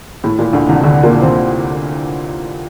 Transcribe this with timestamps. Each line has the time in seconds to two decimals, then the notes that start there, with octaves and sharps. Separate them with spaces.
0.24 A2
0.39 A#2
0.53 D2 D3
0.69 C2 C3
0.83 D2 D3
1.03 A#2 A#3
1.22 C3 C4